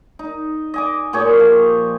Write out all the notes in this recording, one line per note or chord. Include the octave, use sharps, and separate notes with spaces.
D#4
D#5 G#5 D6
A#2 G4 G#4 C#5
F3